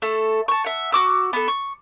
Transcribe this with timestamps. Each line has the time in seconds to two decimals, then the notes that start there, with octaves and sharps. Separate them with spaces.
0.02 A3 A4
0.48 A5 C#6
0.64 E5 F#5
0.92 F#4 D6 E6
1.33 B3 A4
1.48 C#6